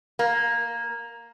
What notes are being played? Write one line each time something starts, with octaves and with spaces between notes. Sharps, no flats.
A#3